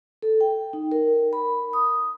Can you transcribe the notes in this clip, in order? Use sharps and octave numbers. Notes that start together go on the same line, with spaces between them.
A4
G5
D#4
A#4
B5
D#6